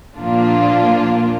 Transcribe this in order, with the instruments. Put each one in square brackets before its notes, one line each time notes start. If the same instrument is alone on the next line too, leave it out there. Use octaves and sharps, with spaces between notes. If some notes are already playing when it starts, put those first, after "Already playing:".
[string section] A#2 F3 A#3 D4 F4